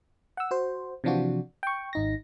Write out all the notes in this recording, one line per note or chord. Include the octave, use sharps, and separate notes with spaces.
F#5 E6
F#4 C5
C3 E3 F3 D4 F4 F#4
G5 C#6
G#1 D#4 A#6